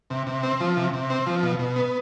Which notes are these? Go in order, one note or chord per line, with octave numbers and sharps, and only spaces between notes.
C3
C3
C4
F3
C3
C3
C4
F3
B2
B2
B3